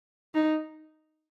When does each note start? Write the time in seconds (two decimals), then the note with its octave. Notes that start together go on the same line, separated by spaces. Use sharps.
0.35 D#4